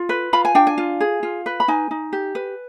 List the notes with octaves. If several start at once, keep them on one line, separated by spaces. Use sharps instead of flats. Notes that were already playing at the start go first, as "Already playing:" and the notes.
Already playing: F4
B4
F4 B5
G#5
D4 G5
G#5
F4
G#4
F4
B4
B5
D#4 G#5
D#4
G4
B4